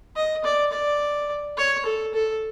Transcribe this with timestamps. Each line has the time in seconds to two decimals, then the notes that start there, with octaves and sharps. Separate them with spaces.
0.16 D#5
0.44 D5
0.72 D5
1.57 C#5
1.85 A4
2.14 A4